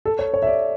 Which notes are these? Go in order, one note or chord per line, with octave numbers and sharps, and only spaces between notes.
A4
C#5
C#5
E5
D5